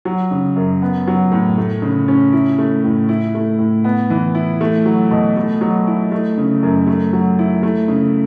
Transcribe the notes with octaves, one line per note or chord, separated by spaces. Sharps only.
F#3
C#3
F#2
B3
F#3
A2
A3
C#3
C#4
E4
A3
A2
E4
A3
A2
B3
E3
E4
A3
F#3
B2
A3
F#3
E4
A3
C#3
F#2
A3
F#3
E4
A3
C#3